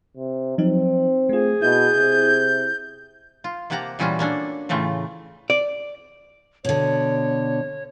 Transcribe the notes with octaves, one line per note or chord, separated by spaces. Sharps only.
C3
F3 F#3 C4 D#4
A3 F4 G#4
B2 E4 G6
C3
F4
C3 A#3 G4 F#5 A5 A#5
A#2 E3 G3 C#4 F4 F#4
A#3 C#4 D4 A4
A2 C#3 E3 A3 F4
D5
B2 D3 C#5